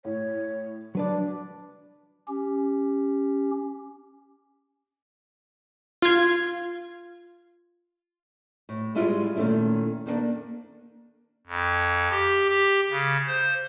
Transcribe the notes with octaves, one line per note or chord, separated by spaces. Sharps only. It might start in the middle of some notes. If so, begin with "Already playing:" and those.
A2 C#5
F#3 D4 B4 D5
C#4 G4
F4 G#6
A2
G#2 G3 G#3 E4 F4
A#2 D#3 A3 C#4 E4
D#3 A#3 C4 D4
F2
G4
G4
C#3
C5